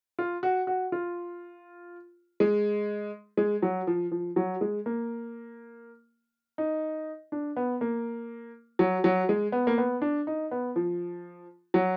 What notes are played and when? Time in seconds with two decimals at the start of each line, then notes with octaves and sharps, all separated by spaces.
0.19 F4
0.43 F#4
0.67 F#4
0.92 F4
2.40 G#3
3.37 G#3
3.62 F#3
3.87 F3
4.11 F3
4.36 F#3
4.61 G#3
4.86 A#3
6.58 D#4
7.32 D4
7.56 B3
7.81 A#3
8.79 F#3
9.04 F#3
9.29 G#3
9.52 B3
9.67 A#3
9.78 B3
10.02 D4
10.27 D#4
10.51 B3
10.76 F3
11.74 F#3